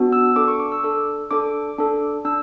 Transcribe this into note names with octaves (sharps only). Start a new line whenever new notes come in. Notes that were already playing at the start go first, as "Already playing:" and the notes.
Already playing: B3 D4 F#4
E6
D4 A4 D6
C#6
D6
E6
D4 A4
D4 A4 D6
D4 A4
D4 E6